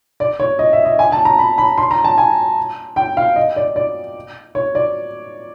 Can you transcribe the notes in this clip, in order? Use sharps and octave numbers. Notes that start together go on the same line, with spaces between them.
D5
C#5
D#5
E5
D#5
G#5
A5
A#5
B5
B5
C6
A#5
A5
G#5
G5
F5
D#5
D5
D5
C#5
D5